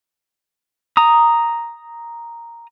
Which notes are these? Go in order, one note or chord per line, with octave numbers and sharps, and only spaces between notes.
A#5 D#6